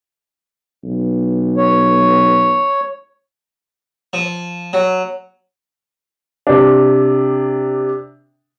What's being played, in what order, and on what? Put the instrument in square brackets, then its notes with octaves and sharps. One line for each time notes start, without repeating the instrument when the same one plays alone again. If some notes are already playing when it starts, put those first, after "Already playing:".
[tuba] B1
[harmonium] C#5
[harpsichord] F3
F#3
[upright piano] C3 D4